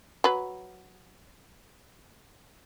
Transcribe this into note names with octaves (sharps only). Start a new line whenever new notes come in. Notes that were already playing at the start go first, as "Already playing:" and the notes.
F#3 B4